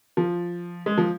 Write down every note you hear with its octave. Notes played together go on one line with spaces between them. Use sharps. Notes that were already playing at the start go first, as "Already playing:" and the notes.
F3
G#3
F3